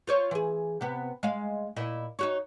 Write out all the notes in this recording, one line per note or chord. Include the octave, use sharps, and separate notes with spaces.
F4 C5 C#5
E3 G#4
C3 B3
G#3 F5
A#2 E4 D#5
D#4 F#4 C#5